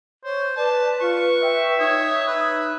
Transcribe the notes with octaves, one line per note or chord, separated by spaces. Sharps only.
C5 C#5
B4 D5 A5
F4 C#6
E5 G5
D#4 C#5 D#6
B4